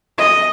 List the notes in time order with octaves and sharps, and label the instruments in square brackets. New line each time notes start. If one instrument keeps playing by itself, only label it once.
[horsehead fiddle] D#5